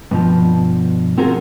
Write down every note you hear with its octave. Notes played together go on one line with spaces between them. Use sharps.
G2 B2 F3
C4 F4 F#4 G#4 A#4